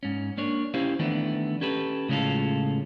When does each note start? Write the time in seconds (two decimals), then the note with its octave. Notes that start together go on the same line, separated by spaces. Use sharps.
0.03 G#2 C#4
0.37 A#3 D4 C#5
0.74 C#4 E4 G4 C5 F5
0.99 D#3 E3 A3 B3 D4 E4
1.61 C#4 G4 A4 B4
2.09 A2 C#3 G#3 C#4 F4 A4